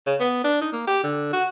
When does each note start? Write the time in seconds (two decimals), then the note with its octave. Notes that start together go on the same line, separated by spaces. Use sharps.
0.07 C#3
0.20 B3
0.44 D4
0.61 D#4
0.73 A#3
0.87 G4
1.04 D3
1.33 F#4